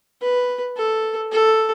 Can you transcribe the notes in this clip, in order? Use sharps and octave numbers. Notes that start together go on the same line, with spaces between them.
B4
A4
A4